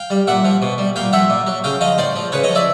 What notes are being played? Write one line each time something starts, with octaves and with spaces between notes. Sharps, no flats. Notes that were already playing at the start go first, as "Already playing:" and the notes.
Already playing: F5 G5
G3
A#2 E5 F#5
F3
B2
G3
A#2 F5 G5
F3 E5 F#5
A#2
F#3
C#3 F5 G5
F3 D#5 F5
A2 C5 D5
F3
C#3 B4 C#5
C#5 D#5
F3
D5 E5